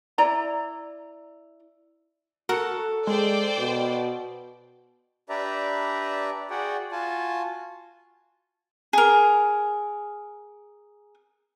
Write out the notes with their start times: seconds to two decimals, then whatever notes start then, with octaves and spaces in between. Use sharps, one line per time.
0.18 E4 D5 A#5
2.49 F#4 A4 A#4 F#5
3.07 G#3 C5 D5 G5
3.59 B2
5.29 D4 G4 B4 D5 E5 A#5
6.50 F#4 G#4 D5 F#5 G5
6.92 F4 F#4 G#5 A5
8.93 G#4 A#4